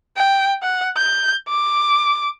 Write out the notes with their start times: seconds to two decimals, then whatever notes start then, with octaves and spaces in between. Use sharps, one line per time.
0.17 G5
0.62 F#5
0.97 G6
1.48 D6